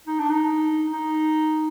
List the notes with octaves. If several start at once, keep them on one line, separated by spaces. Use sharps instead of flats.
D#4
D4
D#4
D#4